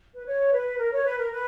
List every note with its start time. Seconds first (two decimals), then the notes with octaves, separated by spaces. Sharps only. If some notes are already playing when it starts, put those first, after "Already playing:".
0.15 B4
0.25 C#5
0.52 B4
0.78 A#4
0.92 C#5
1.05 B4
1.18 A#4
1.32 B4